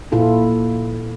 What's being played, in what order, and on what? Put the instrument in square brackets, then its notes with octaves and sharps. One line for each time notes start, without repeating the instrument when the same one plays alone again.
[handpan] A#2 E4 F4 A4